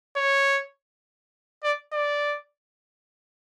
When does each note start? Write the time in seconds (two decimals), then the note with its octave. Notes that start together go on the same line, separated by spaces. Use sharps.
0.17 C#5
1.64 D5
1.93 D5